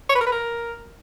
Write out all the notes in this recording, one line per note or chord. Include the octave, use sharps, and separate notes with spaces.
C#5
B4
A#4
B4
A#4